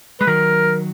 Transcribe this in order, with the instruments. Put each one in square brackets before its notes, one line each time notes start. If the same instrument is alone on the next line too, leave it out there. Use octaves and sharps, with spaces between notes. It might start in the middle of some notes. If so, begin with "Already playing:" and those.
[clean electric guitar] G#3 [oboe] B4
[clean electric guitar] D#3 F#3 [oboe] A#4